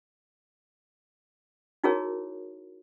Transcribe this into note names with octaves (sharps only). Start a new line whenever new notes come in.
D#4 E4 F#4 G#4 A#4 C#5